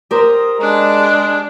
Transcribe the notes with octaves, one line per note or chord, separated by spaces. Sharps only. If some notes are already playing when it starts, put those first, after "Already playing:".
G4 A#4 C5 A#5 C6 D#6
G#3 D4 G#4 F#6